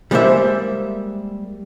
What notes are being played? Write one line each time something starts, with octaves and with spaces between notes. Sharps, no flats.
G3 G#3 A#3 C5 C#5 E5